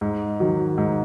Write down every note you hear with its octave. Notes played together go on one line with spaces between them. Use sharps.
G#2
D#3 F#3
G#2